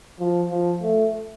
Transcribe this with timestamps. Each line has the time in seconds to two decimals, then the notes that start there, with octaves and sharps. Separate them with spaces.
0.20 F3
0.51 F3
0.82 A3